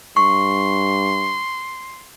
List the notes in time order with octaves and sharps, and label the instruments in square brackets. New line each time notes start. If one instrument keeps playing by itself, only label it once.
[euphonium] G2 [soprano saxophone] C6 [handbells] C#6